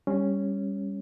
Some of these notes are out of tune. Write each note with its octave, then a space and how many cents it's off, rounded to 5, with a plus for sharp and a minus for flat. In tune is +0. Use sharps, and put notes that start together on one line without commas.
G3 +20 C#4 +0